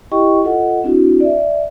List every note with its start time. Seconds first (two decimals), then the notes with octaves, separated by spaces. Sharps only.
0.12 E4 G4 D#5 G5 C#6
0.44 F4 A4 D#5 F#5
0.84 C4 D4 E4 F#4
1.20 D5 E5